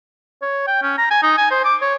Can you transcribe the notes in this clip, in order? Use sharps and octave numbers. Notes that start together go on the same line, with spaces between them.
C#5
G5
C#4
A#5
G#5
D#4
G#5
C5
D6
C#5